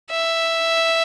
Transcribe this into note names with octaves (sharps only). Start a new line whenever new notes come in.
E5